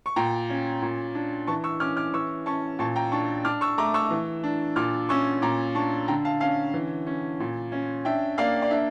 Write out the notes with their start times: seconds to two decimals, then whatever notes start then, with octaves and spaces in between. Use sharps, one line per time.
0.06 C#6
0.16 A#2 G5 A#5
0.50 C#4
0.82 A#2
1.15 D4
1.47 E3 A5 C#6
1.64 C#6 E6
1.80 C#4 D6 F6
1.97 D6 F6
2.14 E3 C#6 E6
2.46 C#4 A5 C#6
2.79 A#2 A5 C#6
2.96 G5 A#5
3.12 D4 A5 C#6
3.45 D4 D6 F6
3.61 C#6 E6
3.78 A3 A#5 D6
3.94 C#6 E6
4.11 E3
4.44 D4
4.76 A#2 D6 F6
5.09 C#4 C#6 E6
5.42 A#2 A#5 D6
5.75 D4 A5 C#6
6.08 D3 G5 A#5
6.25 F5 A5
6.40 C#4 F5 A5
6.74 E3
7.07 C#4
7.40 A#2
7.72 C#4
8.05 D4 E5 G5
8.38 A#3 D5 F5
8.62 D5
8.71 D4 E5